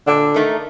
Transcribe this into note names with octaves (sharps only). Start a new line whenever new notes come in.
A#2 D3
A3 D#4 A#4